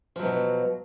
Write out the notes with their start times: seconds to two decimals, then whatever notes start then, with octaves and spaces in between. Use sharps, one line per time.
0.16 F3
0.19 F#3
0.23 B2